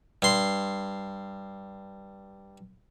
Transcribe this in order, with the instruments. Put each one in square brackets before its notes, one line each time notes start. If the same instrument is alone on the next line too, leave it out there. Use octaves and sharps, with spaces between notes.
[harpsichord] G2 C6